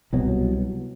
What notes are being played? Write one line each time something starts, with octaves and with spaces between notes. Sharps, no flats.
C2 B2 F#3